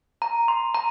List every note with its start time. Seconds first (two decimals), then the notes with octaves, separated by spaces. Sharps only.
0.22 A#5
0.48 C6
0.74 A#5